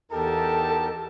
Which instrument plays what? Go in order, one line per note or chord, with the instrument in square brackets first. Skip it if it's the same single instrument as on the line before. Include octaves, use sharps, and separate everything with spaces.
[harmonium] E2 A#4 [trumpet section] D#4 G4 A5 [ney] A4